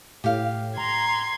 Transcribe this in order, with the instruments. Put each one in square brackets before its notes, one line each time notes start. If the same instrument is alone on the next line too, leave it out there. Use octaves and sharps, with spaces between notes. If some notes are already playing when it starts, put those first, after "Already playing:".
[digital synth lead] A2 [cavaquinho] G4 F5
[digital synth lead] A#5 [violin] C6 G#6